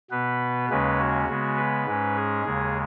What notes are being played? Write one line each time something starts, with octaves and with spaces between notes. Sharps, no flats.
B2 B3 B4
D#2 C#3 G#3 C#4 B4
F#4
C#3 G#3 B3
B4
G#2 G#3 C#4
G#4
D#2 C#3 G#3